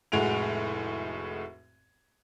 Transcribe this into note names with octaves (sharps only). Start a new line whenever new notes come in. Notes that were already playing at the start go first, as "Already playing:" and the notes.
F1 A2 G#3 F#4 D7 F7